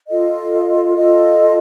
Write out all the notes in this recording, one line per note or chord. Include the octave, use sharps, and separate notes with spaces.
F4 A4 D#5
F4 A4 D#5